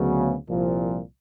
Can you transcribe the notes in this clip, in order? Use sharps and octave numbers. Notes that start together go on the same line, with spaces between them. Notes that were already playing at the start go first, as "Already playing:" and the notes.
Already playing: D2 C#3 F#3 B3
C2 A#2 F3